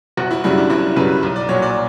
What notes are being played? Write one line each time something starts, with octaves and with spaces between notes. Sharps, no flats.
F#1 F#4
E4
F#2 C#3 G3 E4
D4
F#1 E4
F#2 C#3 G3 B4
B1
D5
A#2 F#3 C#5
D5